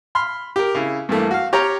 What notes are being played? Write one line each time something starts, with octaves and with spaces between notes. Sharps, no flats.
B5 C6 F6
G4 A#4
C#3 E4
G2 E3 A3 A#3
F#4 F5
G4 C#5 G5 A#5 F6